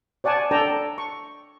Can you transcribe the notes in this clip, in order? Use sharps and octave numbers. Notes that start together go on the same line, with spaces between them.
C#5 D5 F#5 G#5 A5
D4 A4 D5 G5 A5 A#5
C#6